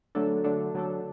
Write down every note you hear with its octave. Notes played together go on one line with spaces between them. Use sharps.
D3 F#3 A3 D4 A4
D3 F#3 A3 D4 A4
D3 F#3 A3 D4 A4